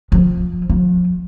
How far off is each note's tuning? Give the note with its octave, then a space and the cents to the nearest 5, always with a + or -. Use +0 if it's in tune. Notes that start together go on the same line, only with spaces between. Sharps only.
F3 +20
F3 +40